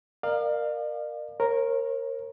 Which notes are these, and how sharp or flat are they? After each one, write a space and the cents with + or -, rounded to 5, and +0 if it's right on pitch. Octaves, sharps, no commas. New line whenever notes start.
A#4 +0 D5 +40 F5 +0
A#4 +0 C#5 -40